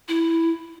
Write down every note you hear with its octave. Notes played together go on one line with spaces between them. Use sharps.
E4